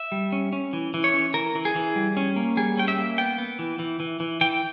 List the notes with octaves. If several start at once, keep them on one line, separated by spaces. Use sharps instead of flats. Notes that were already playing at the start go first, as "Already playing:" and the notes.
Already playing: E5
G3
C#4
C#4
E3
E3
C#5
C#4
E3 A#4
E3
G#4
E3
G3
C#4
A#3
G3 G#4
C#4 G5
E5
A#3
B3 G5
B3
E3
E3
E3
E3
E3 G5